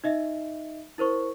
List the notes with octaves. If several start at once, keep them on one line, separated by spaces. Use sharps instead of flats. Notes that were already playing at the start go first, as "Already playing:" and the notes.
D#4 D#5 E5
E4 A#4 C5 C#6